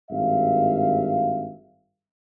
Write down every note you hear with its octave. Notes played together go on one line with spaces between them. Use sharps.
G#1 G2 E5 F5